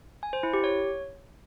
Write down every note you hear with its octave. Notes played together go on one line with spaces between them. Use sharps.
G#5
C5
E4
G4
C#5